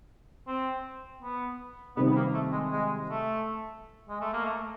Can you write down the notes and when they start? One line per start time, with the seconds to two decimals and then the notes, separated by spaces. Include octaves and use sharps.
0.47 C4
1.22 B3
1.96 C3 D#3 G3 B3 C4
2.10 B3
2.16 A#3
2.34 A3
2.52 G#3
2.71 G#3
3.09 A3
4.09 G#3
4.21 A3
4.33 A#3
4.45 A3